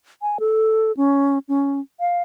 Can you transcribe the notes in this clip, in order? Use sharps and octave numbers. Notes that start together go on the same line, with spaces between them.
G#5
A4
C#4
C#4
F5